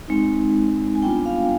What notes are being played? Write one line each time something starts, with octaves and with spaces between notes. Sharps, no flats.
G#3 C4 D#4
G#5
G3 B3 D4 F4 G5
F5